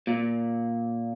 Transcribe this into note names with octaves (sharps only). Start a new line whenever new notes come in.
A#2